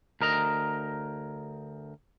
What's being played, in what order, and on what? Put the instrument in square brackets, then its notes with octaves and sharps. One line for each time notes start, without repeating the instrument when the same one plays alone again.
[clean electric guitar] D2 A#4 D#5 A#5